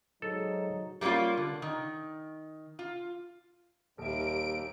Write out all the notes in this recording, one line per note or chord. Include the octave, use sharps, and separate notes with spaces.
G#2 F#3 D#4 A4
G3 A3 A#3 C#4 F4
D3
D#3
F4
D#1 D#2 E5 D7